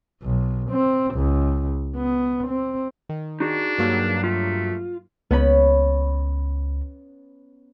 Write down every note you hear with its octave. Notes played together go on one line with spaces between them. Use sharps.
B1
C4
C#2
B3
C4
D#3
D4 D#4 F#4 G#4
G2 F#3 A#3
A3 F4
C#2 B3 C#4 B5